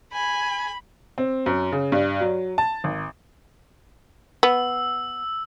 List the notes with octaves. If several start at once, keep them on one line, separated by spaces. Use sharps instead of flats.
G#5 B5
C4
F#2
C#3
G2
F#3
A5
G#1
B3 E6